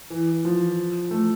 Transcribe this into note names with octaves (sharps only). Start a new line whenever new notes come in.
E3
F3
A3